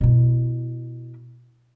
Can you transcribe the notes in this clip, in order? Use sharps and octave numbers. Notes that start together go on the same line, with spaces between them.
B2 E4